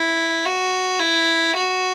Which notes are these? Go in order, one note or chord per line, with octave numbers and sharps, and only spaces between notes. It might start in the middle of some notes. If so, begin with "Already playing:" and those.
Already playing: E4
F#4
E4
F#4